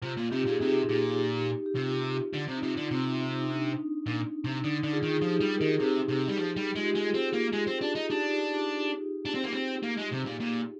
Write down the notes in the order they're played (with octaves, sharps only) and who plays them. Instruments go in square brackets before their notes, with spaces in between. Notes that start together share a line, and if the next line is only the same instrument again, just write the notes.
[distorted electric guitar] C3 [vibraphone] F4
[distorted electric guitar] A#2
[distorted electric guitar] C3 [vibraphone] D#4 G4
[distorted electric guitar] A#2 [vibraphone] G#4
[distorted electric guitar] C3 [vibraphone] D#4 G4
[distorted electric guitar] A#2
[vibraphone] G4
[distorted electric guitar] C3 [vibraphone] F4
[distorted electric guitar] D3
C3
[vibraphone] D#4
[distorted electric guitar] C3 [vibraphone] F4
[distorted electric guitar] D3
[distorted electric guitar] C3 [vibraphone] C4
[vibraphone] C4
D#4
D4
[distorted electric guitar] A#2
C3
[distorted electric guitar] D3 [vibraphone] D#4
[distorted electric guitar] D3
[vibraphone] F4 G#4
[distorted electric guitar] D#3
[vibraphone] G#4
[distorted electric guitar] F3 [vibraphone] D#4 G4
[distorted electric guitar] G3
[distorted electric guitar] D#3 [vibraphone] A#4
[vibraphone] G#4
[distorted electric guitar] C3 [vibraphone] D#4 G4
[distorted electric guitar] C3
G3
F3
G3
[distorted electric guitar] G#3 [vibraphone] F4
[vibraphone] G4
[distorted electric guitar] G#3 [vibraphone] F4 G#4
[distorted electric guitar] C4
A#3
G#3
C4
D4
D#4
[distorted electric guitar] D4 [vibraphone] D#4 G4
[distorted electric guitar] D4
C4
A#3
C4
A#3
G#3
C3
A#2
A#2